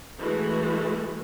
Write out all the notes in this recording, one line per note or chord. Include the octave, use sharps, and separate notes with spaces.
E3 G#3 A3 F#4